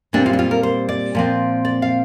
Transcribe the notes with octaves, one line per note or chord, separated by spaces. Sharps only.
A#2 G3 C4 D4
F4
D4
F4
A#4
C5
D5
A#2 F3 C4
D5
F5